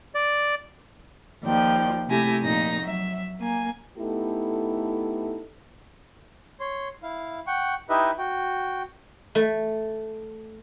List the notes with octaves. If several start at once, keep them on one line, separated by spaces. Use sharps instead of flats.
D5
D#2 F3 D5 G5
C3 A3 E4 G4 G#5 A#6
F2 A#2 D#4 A#6
F#3 E5
A#3 G#5
A3 B3 D#4 E4 G4 A4
C#5 C6
E4 F5
F#5 G5 C#6
D#4 E4 G4 B4 D#5 E5
F#4 G5
A3